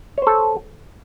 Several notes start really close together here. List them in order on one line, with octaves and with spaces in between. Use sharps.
C#5 C5 A4